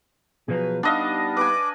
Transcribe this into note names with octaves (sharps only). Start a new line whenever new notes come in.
B2 F3 F#3 G#4 B4
G3 B3 D4 D#4 D#5 F5
B4 G#5 D6